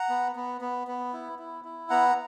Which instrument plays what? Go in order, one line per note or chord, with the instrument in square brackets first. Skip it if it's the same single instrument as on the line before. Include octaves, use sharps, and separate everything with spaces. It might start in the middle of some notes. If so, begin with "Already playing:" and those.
Already playing: [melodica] F#5 A#5
B3
B3
B3
B3
E4
E4
E4
B3 F#5 A#5